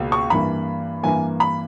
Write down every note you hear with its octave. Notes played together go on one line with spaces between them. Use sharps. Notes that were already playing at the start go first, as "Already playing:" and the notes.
Already playing: C#2 B2 A#3
C#6
G2 E3 A#3 B5
G2 E3 A#3 G#5
B5